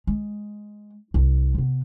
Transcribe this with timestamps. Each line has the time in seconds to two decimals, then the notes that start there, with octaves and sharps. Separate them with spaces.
0.07 G#3
1.14 C2
1.55 C3 B3